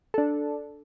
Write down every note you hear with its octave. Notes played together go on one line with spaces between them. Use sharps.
D4 A4